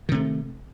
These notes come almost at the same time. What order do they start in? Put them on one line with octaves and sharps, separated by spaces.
D#3 C3 A3